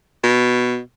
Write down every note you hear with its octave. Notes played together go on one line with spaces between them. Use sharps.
B2